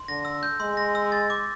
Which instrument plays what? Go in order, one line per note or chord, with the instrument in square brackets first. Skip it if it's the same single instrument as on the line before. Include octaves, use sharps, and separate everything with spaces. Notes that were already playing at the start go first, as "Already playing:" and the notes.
Already playing: [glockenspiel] C6
[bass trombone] D3 [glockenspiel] A#6
[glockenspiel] E6
G6
[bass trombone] G#3 [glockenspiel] C6
[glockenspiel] A#6
E6
A6
D6